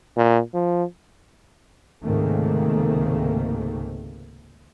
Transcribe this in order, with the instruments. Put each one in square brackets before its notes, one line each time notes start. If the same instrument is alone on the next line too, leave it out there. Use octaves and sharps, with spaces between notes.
[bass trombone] A#2
F3
[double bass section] C#2 G#2 C3 D#3 A3 A#3